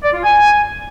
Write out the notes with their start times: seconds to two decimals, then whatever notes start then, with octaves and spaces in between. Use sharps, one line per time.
0.03 D5
0.13 F4
0.23 G#5